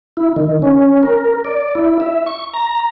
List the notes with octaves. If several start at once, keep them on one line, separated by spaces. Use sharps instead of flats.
E4
D#3
C#4
A#4
D5
E4
E5
C#6
A#5